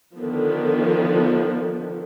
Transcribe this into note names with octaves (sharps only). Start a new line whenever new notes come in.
D3 D#3 F3 B3